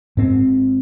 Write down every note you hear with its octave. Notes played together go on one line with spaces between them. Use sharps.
G#2 C4